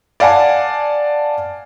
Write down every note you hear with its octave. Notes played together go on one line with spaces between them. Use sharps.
D5 F5 F#5 G#5 A5